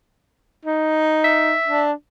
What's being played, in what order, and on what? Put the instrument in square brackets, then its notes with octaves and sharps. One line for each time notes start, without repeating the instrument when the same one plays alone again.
[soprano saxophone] D#4
[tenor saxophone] E5
[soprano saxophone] D4